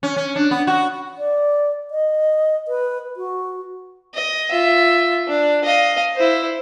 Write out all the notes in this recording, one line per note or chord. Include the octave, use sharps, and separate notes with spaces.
C#4
C#4
D4
B3
F#4
D5
D#5
B4
F#4
D#5
F4 E5
D4
D#5 F5
E4 C5